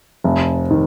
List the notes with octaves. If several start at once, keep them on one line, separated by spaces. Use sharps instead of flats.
F1
D#3